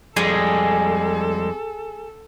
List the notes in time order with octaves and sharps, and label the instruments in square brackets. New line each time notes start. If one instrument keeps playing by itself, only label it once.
[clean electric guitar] F2 G3 G#3 [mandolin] G#4 [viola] A4